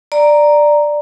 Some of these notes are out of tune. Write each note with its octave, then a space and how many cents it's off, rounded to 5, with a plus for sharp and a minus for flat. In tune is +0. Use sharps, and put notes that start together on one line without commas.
D5 +10 A#5 +0